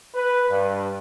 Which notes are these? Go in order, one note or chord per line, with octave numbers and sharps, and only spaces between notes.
B4
G2